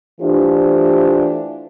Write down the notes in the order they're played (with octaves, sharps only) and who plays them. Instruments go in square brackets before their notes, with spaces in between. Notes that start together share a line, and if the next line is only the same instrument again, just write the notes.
[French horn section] E3 A3 D4 F4 G4 C5